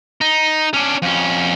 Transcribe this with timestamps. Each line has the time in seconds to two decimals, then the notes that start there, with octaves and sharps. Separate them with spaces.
0.21 D#4
0.74 C#4 D4
1.02 F2 C#4